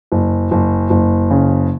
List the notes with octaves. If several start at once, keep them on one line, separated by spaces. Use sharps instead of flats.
F#1
F#1
F#1
C#3